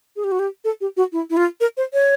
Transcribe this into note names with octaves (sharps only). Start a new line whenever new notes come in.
G#4
G4
F#4
G4
A4
G4
F#4
E4
E4
F4
A#4
C5
C#5